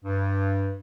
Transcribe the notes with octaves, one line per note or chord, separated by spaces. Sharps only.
G2